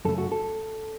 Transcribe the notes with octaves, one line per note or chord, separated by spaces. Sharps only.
F#2 C#3 A3 A4
F#4
A4